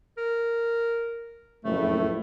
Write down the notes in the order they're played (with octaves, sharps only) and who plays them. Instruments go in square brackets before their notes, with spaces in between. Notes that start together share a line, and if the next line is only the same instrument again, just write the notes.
[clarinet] A#4
[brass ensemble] F#1 F2 A2 [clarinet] A3